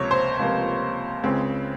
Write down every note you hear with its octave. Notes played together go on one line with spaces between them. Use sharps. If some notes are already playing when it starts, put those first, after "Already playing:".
Already playing: C#2 C3 F3 A#3 C#5
C5
C#2 C3 F3 A#3
C#2 C#3 G#3 C4